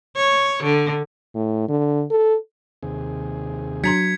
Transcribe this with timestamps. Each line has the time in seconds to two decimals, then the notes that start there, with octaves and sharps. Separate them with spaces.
0.16 C#5
0.64 D3
1.35 A2
1.69 D3
2.10 A4
2.83 D#2 C3 G#4
3.84 F#3 D4 A#5 C6 G#6 B6 C#7